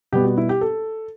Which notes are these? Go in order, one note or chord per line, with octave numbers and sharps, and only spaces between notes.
B2 G3 B3 G4
F#4
E4
G4
A4